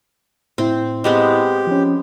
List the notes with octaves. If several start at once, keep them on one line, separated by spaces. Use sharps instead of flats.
A2 C4 E4
G#3 B3 C4 G4
F3 C#4